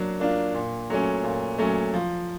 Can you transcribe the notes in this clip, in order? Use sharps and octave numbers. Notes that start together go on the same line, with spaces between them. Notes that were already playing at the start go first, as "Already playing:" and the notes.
Already playing: F#3 A#3 D4
A#3 D4 F4
A#2
F#3 A3 C#4
A#2
F#3 A3 C#4
F3